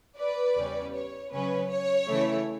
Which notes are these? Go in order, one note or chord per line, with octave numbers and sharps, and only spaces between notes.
B4 D5
E2 C#3 G3 C#4
C#5
C#3 F#3 C#4 B4
C#5
C#3 E3 A3 E4